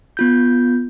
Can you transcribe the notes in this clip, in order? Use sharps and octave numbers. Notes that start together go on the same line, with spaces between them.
B3 F4 G6